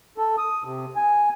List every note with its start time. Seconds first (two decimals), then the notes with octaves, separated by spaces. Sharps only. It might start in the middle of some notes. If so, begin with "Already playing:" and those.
0.18 A4
0.38 D#6
0.64 C3
0.96 G#5